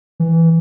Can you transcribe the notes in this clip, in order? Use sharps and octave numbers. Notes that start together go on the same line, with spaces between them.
E3